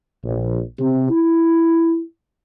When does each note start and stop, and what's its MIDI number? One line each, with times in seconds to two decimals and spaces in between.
0.23 0.59 34
0.78 1.09 48
1.10 2.00 64